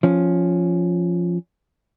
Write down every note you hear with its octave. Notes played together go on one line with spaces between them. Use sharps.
F3 C#4